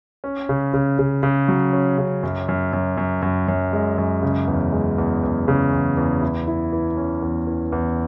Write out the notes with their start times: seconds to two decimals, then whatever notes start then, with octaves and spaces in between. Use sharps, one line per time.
0.24 C#4
0.49 C#3
0.74 C#3
0.99 C#3
1.23 C#3
1.48 F#3
1.73 C#4
1.98 C#3
2.23 F#2
2.49 F#2
2.73 F#2
2.97 F#2
3.22 F#2
3.48 F#2
3.73 G#3
3.98 F#2
4.23 C#3
4.47 E2
4.72 G#3
4.98 E2
5.23 E2
5.48 C#3
5.72 E2
5.97 E2
6.22 E4
6.48 E4
6.72 E3
6.97 C#4
7.22 E2
7.47 E3
7.72 E2